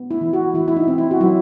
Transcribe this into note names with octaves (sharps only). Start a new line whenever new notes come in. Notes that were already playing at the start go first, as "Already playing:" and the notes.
Already playing: B3
E4
E3
F#4
E3 E4
E4
D#4
C4
E4
F#4
F#3 E4